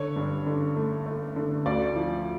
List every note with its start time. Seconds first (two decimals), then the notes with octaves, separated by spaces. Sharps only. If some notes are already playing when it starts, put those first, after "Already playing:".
Already playing: D3 C#5
0.16 G2
0.46 D3
0.76 A3
1.06 A3
1.36 D3
1.66 D2 D5
1.96 F3